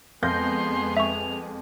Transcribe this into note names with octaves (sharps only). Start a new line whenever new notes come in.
F2 G#3 B3 G#4 C6 G6 A#6
E5 C#6 F7